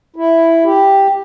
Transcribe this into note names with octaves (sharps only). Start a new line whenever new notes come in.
E4
G4